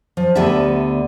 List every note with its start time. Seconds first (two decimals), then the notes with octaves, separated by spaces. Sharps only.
0.17 F3
0.35 D2 D3 B3 G4 E5 A5